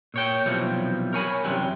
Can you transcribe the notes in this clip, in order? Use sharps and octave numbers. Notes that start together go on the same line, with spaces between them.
A#2 C#5 G5
B1 C3 E3 F3 G3
A#4 C#5 G#5 B5
F#2 C3 E3 G3